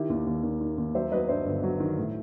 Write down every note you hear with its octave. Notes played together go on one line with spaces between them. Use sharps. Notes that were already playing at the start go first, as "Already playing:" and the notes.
Already playing: D#3 E4 G4
D#2
D#2
D#2
D#3
D#2
F#3 C5 E5
F#3 B4 D#5
G2 C5 E5
G1
F#3
D#3
A2